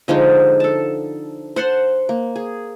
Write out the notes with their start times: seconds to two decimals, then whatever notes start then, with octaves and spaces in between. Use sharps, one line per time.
0.08 D3 F3 G#3 D#4
0.60 A4 A5
1.56 C5 F#5 A5 C6
2.09 A#3
2.36 G#4